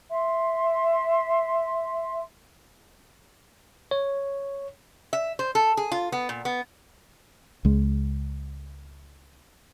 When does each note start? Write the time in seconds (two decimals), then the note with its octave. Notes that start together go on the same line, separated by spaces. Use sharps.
0.10 E5 C6
3.91 C#5
5.13 E5
5.39 C5
5.55 A4
5.77 G#4
5.92 F4
6.12 B3
6.29 A#2
6.45 B3
7.65 C#2 G#3